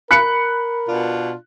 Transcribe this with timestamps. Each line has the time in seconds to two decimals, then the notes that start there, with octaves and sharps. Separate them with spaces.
0.11 A#4 B5 F#6 C#7
0.89 B2 D4 F4